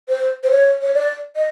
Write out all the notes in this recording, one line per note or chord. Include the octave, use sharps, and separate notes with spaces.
C5
C5
C#5
C#5
D5
D#5